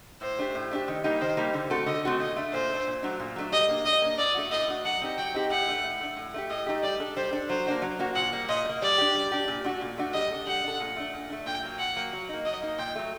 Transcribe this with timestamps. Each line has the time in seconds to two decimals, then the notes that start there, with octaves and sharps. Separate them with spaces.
0.21 A2 C5
0.39 A3 D4 G4
0.55 A2
0.71 A3 D4 G4
0.88 D#3
1.04 G3 A#3 D#4 G4
1.21 D#3 C5
1.37 G3 A#3 D#4 G4
1.54 D3
1.70 A3 C4 F#4 A4
1.86 D3 D#5
2.03 A3 C4 F#4 A4
2.20 A#2 D#5
2.36 A3 D4
2.53 A#2 C5
2.70 A3 D4
2.87 A#2
3.03 F#3 A3 D4
3.20 A#2
3.36 F#3 A3 D4
3.52 G3 D#5
3.68 A#3 D4
3.85 G3 D#5
4.02 A#3 D4
4.18 A2 D5
4.34 A3 D4 F#4
4.52 A2 D#5
4.68 A3 D4 F#4
4.84 F#3 F#5
5.01 C4 D#4 G4
5.18 F#3 G5
5.34 C4 D#4 G4
5.50 A2 F#5
5.68 A3 D4
5.84 A2
6.00 A3 D4
6.16 A2
6.34 A3 D#4 G4
6.50 A2 D#5
6.66 A3 D#4 G4
6.83 G3 D5
7.00 D4 A4
7.16 G3 C5
7.33 D4 A4
7.49 F#3 C5
7.67 A#3 D4 F#4
7.82 F#3
7.99 A#3 D4 F#4
8.15 A#2 F#5
8.33 G3 A#3
8.49 A#2 D#5
8.65 G3
8.69 A#3
8.82 G3 D5
8.98 D4 G4
9.15 G3
9.32 D4 G4
9.48 A#2
9.64 A3 D4 F#4
9.81 A#2
9.98 A3 D4 F#4
10.14 G3 D#5
10.31 D4 A4
10.47 G3 F#5
10.64 D4 A4
10.80 A#2
10.96 A3 D4
11.13 A#2
11.30 A3 D4
11.46 A#2 G5
11.63 F#3 A#3
11.79 A#2 F#5
11.96 F#3 A#3
12.13 F#3
12.29 A#3 D#4
12.45 F#3 D#5
12.62 A#3 D#4
12.78 A#2 G5
12.95 F#3 A3